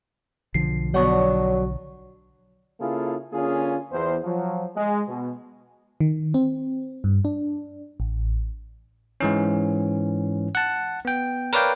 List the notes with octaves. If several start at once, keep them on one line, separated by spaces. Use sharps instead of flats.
B1 D3 F3 C7
B2 F#3 D4 C#5 F#5 C#6
C#3 A#3 E4 F4 G#4 A4
D3 A#3 C#4 F4 G#4
E2 C5
F3 F#3
G#3
B2
D#3
C4
G2
D4
A1
G#2 E3 C#4
F#5 A5
B3 G5
A#4 B4 C#5 D5 F5 G5